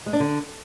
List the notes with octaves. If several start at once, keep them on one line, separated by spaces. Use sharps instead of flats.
G#3
D4
D3